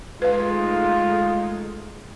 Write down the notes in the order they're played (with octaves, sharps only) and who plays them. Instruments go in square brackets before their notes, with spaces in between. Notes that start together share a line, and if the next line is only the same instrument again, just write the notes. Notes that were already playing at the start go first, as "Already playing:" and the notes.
[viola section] G#3 A3 D#4 [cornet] F4 [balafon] B4 F5